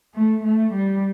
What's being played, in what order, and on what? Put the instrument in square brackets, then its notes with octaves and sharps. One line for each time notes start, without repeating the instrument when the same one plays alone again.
[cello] A3
A3
G3